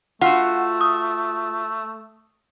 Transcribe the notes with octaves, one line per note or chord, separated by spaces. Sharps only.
A3 F4 F#4 F#5
D#6